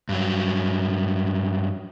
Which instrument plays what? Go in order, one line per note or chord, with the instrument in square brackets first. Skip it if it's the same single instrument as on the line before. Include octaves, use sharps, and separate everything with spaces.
[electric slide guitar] G2 F#3